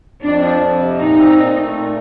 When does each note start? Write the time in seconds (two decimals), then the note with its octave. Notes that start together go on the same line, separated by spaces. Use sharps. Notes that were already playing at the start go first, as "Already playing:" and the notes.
0.22 F2 D4
0.42 F3
0.60 F2
0.79 C3
0.98 A#2 D#4
1.17 C4
1.36 A#2
1.55 A3
1.74 A#2